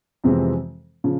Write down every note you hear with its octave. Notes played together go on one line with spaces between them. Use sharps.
F2 C3 E3 G#3 C4
C#3 F3